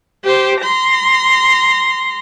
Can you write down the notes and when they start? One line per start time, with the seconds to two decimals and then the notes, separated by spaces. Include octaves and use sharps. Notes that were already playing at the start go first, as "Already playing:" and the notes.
0.25 G4 C5
0.61 A#5 C6